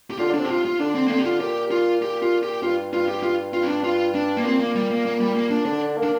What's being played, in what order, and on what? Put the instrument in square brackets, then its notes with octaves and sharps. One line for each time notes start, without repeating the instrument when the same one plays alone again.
[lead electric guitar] G4
[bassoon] D3 [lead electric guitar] F4
[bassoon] D3 [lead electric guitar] D4
[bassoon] C3
[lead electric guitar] G4
F4
F4
[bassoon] D3 [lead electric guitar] D4
[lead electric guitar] C4
A#3
[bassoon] D3 [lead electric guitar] C4
[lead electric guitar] G4
F4
[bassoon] A#2 [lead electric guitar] G4
[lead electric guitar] F4
G4
F4
G4
[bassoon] G2 [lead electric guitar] F4
[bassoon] G2 [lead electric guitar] F4
[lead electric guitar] G4
F4
F4
C4
D4
F4
D4
A#3
[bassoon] A#2 [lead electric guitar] C4
[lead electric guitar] A#3
G3
A#3
A#3
G3
A#3
D4
[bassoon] D3 [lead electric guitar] D4
[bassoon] A#3
[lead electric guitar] D4